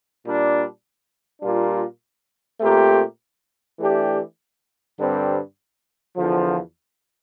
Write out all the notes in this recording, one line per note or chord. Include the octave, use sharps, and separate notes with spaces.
A#2 G3 D4
A#2 G3 A#3 D4 F4
A#2 A3 C4 G4 A#4
E3 A3 D4 G4
G2 D3 G3 C4
E2 D3 F3